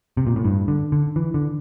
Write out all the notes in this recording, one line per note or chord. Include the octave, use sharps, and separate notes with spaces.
C3
A#2
A2
G2
D3
D3
E3
D3